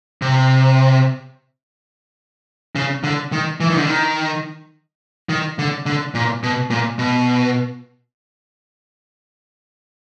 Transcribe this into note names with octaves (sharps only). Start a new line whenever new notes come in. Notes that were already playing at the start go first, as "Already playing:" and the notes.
C3
C#3
D3
D#3
E3
D#3
D3
D#3
D#3
D3
D3
A#2
B2
A#2
B2